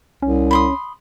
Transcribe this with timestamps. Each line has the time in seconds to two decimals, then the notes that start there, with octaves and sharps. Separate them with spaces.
0.22 C2 C#4
0.51 B5 C6 D#6